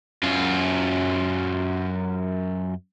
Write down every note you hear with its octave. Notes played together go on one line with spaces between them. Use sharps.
F#2 F4